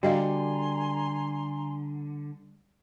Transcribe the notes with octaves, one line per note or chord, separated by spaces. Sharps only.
D3 G3 F#4 D#5 F5 G#5 A#5 C6